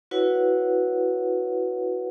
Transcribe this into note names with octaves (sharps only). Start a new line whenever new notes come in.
E4 F#4 B4 C#5 F#5